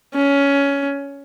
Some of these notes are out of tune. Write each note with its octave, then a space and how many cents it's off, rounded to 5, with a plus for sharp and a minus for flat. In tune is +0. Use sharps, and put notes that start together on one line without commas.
C#4 +15